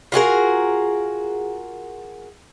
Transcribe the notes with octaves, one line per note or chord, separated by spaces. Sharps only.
F4 F#4 G#4 A#4